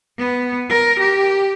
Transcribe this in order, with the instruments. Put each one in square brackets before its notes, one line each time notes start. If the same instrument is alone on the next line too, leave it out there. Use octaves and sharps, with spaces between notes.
[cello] B3
A#4
G4